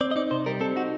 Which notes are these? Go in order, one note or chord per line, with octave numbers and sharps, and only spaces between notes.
C4 D5
D#5
D#4 D5
C3 C5
G3 A#4
C4 A4
D#4 F#4